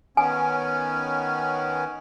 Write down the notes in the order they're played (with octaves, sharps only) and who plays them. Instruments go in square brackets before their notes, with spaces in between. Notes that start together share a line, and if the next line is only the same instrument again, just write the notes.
[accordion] D#3 B3 C#4 [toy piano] G#5